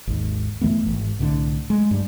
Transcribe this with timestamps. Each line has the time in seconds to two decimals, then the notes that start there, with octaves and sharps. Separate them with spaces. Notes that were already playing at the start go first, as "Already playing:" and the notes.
0.07 G#1 D#2
0.61 F#2 E3 A3 B3
0.86 G#1
1.19 C2 A2 D3
1.70 G#3
1.91 G2 G3